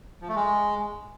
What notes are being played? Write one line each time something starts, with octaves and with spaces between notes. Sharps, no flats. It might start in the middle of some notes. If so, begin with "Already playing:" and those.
F3
A3
G#3